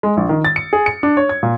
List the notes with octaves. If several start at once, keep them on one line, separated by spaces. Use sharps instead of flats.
G#3
A#1
D#3
A6
C#7
G#4
C#7
D4
C#5
G#6
A#2